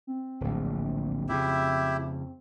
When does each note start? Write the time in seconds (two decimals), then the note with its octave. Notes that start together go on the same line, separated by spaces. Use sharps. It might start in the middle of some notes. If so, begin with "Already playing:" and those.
0.07 C4
0.41 D1 A#1
1.29 F2 C#3 E4 G4 E5